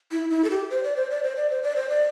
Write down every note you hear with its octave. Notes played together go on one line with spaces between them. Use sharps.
E4
E4
A4
G4
C5
D5
C5
D5
C5
D5
C5
D5
C5
D5